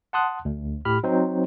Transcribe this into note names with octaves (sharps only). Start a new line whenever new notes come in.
F#5 A5 C6 D#6 F#6
D2
A2 G4 B5 F6
F#3 C4 D#4 C5